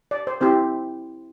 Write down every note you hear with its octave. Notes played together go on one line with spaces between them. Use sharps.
D5
C5
C4 E4 G4 C5